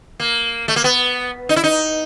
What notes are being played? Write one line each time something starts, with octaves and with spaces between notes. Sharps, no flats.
A#3
A3
A#3
B3
D#4
E4
D#4